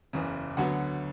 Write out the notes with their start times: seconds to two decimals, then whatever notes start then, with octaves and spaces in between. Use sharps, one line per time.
0.13 F#1 E2 C#3
0.57 D2 D3 F#3 B3 F#5